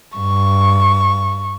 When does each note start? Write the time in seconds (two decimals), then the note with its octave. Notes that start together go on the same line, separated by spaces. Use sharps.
0.17 G2 C#6